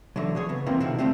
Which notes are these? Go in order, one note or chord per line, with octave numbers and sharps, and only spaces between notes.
D3 E3 F#3
F#3 G#4 C#5
C#3 B3
F2 C3 E3 A#3
B2 D3 D#3 F3 E4 F#4
D2 D#3 G3 A3 C4